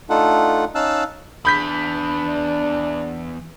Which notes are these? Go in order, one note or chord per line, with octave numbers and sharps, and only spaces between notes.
A3 D4 D#4 F4 A4 F#5
C#4 D#4 F5 A5 E6 F#6
E2 D4 B5 G6 B6
D5